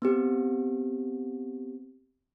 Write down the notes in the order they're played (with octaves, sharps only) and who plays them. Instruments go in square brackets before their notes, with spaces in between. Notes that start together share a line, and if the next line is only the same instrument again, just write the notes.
[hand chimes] B3 C4 G4